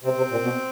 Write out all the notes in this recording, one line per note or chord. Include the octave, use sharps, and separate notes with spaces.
C3 C4
C3
A#2
B2